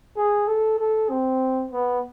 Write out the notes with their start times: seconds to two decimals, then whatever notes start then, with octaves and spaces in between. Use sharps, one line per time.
0.17 G#4
0.48 A4
0.79 A4
1.10 C4
1.71 B3